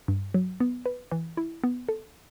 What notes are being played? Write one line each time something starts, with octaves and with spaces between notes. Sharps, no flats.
G2
F#3
B3
B4
E3
E4
B3
A4